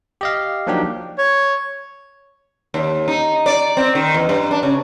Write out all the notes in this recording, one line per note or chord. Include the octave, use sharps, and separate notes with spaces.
G4 D#5 F5
F3 F#3 A#3 D4 D#4 G4
C#5
D#2
D#4
D5
C4
D#3
E2
G2
D4
C#3